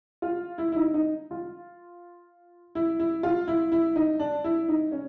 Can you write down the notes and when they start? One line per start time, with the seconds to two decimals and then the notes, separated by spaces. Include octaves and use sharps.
0.22 F4
0.58 E4
0.72 E4
0.76 D#4
0.94 D#4
1.31 F4
2.75 E4
2.99 E4
3.23 F4
3.48 E4
3.72 E4
3.96 D#4
4.19 D4
4.44 E4
4.68 D#4
4.92 C#4